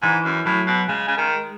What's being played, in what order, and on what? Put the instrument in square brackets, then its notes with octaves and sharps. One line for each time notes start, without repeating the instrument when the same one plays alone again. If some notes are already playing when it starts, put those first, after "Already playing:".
[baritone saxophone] G#2 [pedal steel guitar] E3
[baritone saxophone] F#2
[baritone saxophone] A2 [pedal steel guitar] F#3
[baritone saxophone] B2
[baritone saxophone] C#3 [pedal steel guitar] G#3
[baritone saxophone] C#3
D#3